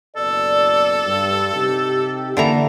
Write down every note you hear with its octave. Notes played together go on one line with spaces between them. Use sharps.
F#1 B2 A4 D5
G2
C3 D#4 G4
D3 E3 A#3 A#5